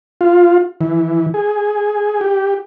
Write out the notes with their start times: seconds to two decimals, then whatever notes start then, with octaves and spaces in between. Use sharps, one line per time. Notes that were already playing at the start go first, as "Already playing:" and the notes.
0.21 F4
0.81 E3
1.34 G#4
2.21 G4